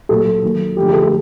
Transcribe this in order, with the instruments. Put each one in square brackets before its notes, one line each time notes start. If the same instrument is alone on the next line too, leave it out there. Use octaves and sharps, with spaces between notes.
[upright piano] A#2 F#3 A#3 A4
D#3 F#3 A#3
D3 F3 A3 G4
G#4
A4
A4